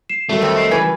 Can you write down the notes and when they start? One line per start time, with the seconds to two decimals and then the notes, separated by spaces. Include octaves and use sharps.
0.09 C7 E7
0.29 D#3 F#3 G3 A3
0.42 F2 C4
0.56 D#5 C7 D7
0.71 C#3 E3 B4 G#5 G#6